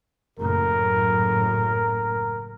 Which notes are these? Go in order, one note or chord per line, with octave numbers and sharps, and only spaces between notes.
F#1 F#2 A2 A#4